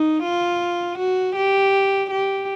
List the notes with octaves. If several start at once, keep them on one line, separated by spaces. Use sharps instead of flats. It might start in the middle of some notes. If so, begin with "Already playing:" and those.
Already playing: D#4
F4
F#4
G4
G4